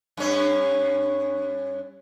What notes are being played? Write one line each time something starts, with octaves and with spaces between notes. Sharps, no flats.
G2 C#4